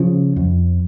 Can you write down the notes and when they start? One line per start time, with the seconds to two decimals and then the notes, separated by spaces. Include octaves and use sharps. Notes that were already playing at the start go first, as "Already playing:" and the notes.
Already playing: C#3 F3
0.36 F2